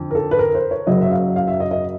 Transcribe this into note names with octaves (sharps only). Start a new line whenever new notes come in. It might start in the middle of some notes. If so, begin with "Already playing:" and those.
Already playing: F2 D3
A#4
A4
B4
A#4
C5
C#5
F#1 F#2 C#3 F#3 D#5
E5
F5
F5
E5
D#5
D#5